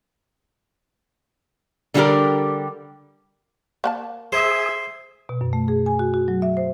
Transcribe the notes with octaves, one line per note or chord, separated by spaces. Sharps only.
D3 G3 D4 F#4 G4 A#4
A#3 F#5 A5
G#4 C5 E5
B2
F#2
A3
G#4
G#5
F#4
F#4
F#3
E5
C5